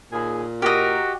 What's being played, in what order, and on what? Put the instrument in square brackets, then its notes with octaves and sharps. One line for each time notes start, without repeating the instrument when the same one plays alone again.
[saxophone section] D#2 G#4 [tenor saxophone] A#2
[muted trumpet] F#4 [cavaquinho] G4 D#5 [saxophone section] A#4